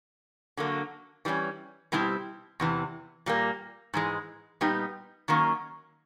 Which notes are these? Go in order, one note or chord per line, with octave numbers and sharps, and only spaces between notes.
D3 F#3 A#3 D4
E3 G3 A#3 C#4
B2 G3 C4 E4 G4
E2 C3 E3
A#2 G3 A#3
G#2 E3 G#3
A#2 G3 B3 D#4 G4
D#3 F#3 A#3 C#4